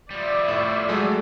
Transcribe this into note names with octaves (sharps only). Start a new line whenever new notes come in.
F3 G3 D5 E5
A2
F#3 G#3 A3